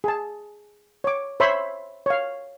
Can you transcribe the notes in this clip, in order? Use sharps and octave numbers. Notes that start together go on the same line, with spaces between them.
G#4 A5
C#5 D6
C5 C#5 E5 B5 C6
C#5 F5